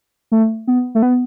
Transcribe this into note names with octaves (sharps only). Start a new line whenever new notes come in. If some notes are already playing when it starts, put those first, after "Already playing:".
A3
B3
A3
B3